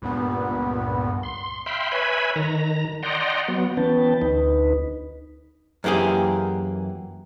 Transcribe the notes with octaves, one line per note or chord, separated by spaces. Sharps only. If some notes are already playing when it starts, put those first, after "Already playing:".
C#2 G2 A#2 B3
C6
E5 F5 G5 B5 C6
B4 C#5 E5 G#5 B5
D#3 A#5
D5 D#5 F#5 G5 A#5 C6
F#3 B3
E3 B3 C#4 B4 G5 A5
D2 D#4 B4
F#2 E3 A#3 G4 G#4